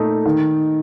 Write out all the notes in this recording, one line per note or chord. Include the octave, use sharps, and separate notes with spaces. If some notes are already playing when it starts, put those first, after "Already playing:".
Already playing: A#2 A3 D#4
D#3